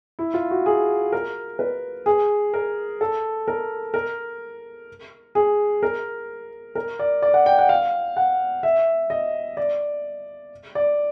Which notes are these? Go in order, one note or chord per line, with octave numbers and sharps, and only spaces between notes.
E4
F4
F#4
G#4
A#4
B4
G#4
A#4
A4
A#4
A#4
G#4
A#4
A#4
D5
D5
F#5
G5
F#5
F5
F#5
E5
D#5
D5
D5